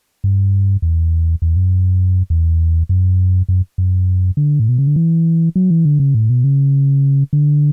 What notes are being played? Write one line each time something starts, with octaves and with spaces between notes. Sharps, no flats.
G2
E2
E2
F#2
E2
F#2
F#2
F#2
D3
A2
B2
C#3
D3
E3
F#3
E3
D3
C#3
A2
B2
C#3
D3